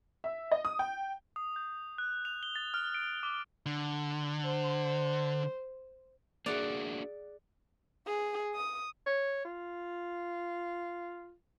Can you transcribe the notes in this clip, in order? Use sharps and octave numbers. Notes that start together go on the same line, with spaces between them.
E5
D#5
D#6
G5
D#6
G6
F#6
F7
G7
A6
F6
D7
D6
D3
C5
A#3 D4 F#4 G#4 D5 F#5 F7
G#4
D#6
C#5
F4